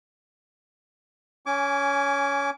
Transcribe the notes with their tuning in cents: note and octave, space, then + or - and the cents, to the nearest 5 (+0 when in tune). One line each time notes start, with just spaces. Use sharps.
C#4 +15 G#5 +0 D6 -25